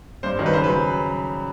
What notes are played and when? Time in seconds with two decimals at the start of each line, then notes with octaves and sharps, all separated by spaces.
0.23 G2 C5
0.39 D#3 F#3
0.46 B4
0.53 C#3 C5
0.64 B4
0.70 F#3